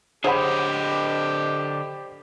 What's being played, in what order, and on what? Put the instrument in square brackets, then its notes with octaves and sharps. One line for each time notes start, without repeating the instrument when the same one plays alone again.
[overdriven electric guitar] D3 D#5 [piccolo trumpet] G4 [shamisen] G#4 C#5 F#5 [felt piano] C5 B5